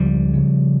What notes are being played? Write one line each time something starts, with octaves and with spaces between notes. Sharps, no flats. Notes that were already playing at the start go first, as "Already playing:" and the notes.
Already playing: C#2 F3 G3
C#3